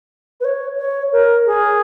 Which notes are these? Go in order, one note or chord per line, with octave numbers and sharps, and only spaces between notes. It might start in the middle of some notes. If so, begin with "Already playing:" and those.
B4
C#5
C#5
A#4
G#4